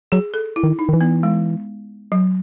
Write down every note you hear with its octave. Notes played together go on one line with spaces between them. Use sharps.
F#3 G#4
A4
E4
D#3
D#4
D#3
E3
B3
G#3
F#3